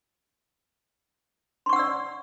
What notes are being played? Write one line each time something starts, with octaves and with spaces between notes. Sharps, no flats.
D5 F#5 C6 C#6 E6